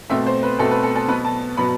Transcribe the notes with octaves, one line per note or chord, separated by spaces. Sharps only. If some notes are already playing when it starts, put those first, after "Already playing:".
B2 A3 C4 E5
C5
B4
B2 A3 C4 A4
B4
A4
A4
B2 F#3 B3 B4
A5
B2 F#3 B3 B5